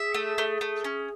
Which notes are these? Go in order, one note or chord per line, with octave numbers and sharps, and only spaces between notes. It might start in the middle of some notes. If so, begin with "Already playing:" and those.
Already playing: G#4 E5
A3
A3
A3
C#4